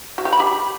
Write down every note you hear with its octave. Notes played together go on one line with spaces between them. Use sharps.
F#4
G4
B5
G4